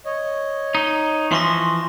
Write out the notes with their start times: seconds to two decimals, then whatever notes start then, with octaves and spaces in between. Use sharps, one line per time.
0.06 C#5 D#5
0.75 D#4
1.32 E3 F3 C6 C#6 A#6